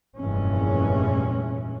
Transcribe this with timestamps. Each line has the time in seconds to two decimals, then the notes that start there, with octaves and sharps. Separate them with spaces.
0.17 F1 G2 A#2 E3 G#3 C#4